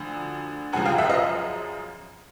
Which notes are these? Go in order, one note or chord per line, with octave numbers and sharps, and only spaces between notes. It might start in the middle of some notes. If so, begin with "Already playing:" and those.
Already playing: D2 D3 F3
F#2 C#3 F3 F#5 G#5
F5 G5
E5 F#5
D#5 F5